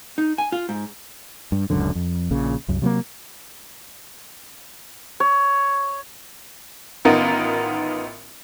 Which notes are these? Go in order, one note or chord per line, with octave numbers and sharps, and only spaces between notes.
D#4
G#5
F4
G#2
G2
D1 C#2 F#2 D3
F2
A#1 A#2 C#3
C2 F#2
C3 F#3 G3 A#3
C#5
A1 D#3 B3 F4 A#4 D#5